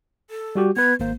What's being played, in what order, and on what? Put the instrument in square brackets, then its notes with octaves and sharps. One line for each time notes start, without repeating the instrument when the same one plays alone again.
[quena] A4
[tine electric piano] G3 F#4 G4
[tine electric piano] B3 B4 [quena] G#6
[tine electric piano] G#1 A#3 [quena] C5